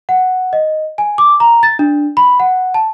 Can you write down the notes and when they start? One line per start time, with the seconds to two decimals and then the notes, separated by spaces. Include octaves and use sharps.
0.09 F#5
0.53 D#5
0.98 G#5
1.18 D6
1.40 A#5
1.63 A6
1.79 D4
2.17 B5
2.40 F#5
2.74 A5